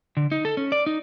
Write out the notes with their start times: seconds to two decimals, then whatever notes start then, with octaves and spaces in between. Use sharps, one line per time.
0.17 D3
0.32 D#4
0.45 A4
0.57 C#4
0.72 D5
0.86 D#4